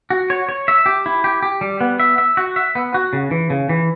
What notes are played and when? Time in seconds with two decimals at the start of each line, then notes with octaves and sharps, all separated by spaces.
0.10 F#4
0.30 C#5
0.49 C#5
0.68 E5
0.86 G4
1.06 E4
1.24 G4
1.42 G4
1.61 G3
1.81 B3
2.00 E5
2.18 E5
2.37 F#4
2.56 E5
2.75 B3
2.94 F#4
3.13 C#3
3.31 E3
3.50 C#3
3.69 E3